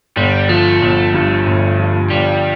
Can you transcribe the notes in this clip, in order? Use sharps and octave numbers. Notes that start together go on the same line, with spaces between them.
G1 G3
F3 A3
G1
G2
G1
F3
G1 G3